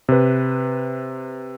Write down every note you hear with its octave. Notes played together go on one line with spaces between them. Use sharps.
C3 B4